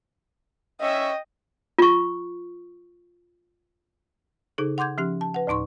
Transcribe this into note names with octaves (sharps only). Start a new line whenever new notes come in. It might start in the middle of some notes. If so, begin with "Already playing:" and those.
C#4 D#5 E5 G5
F4 C#6
C#3 D#4 G#4 A4
F#5 C6 D6 G6 G#6
F3 C#4 G4
A5
B4 F#5
D2 A2 D#4 C6 C#6